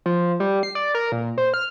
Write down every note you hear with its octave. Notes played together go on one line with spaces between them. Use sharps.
F3
G3
C7
D5
A#4
A#2
C5
F6